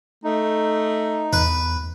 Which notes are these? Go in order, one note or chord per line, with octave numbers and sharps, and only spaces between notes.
A3 D#4
E2 B4